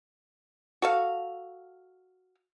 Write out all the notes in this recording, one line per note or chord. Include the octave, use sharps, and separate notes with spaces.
F#4 A4 F5